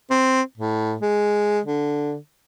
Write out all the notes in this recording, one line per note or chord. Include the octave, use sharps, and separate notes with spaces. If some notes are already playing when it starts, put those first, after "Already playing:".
C4
A2
G#3
D3